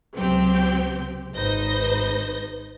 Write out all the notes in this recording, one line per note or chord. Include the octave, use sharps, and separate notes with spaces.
C#2 C3 F#3 C4 G4 G6
G#1 D#4 B4 C5 G6 A#6